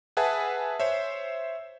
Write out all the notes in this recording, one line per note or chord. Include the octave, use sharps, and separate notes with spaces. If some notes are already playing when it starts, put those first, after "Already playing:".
G#4 B4 E5 F#5 G#5 A5
C5 C#5 E5